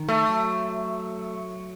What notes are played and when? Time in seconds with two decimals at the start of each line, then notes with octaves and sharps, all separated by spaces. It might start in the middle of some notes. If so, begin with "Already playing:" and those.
Already playing: D#3
0.09 A3
0.29 F#3